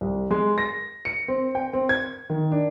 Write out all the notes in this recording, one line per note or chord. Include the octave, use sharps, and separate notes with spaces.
C2
G#3
A#6
C#7
C4
G5
C4
G#6
D#3
D4